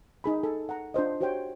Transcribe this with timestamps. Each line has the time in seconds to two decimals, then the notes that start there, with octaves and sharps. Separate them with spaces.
0.24 D#4 G#4 B5
0.43 A4 G#5
0.69 F#5 A#5
0.94 D4 F4 C5 D#5
1.21 F#4 G4 C5 C#5 G5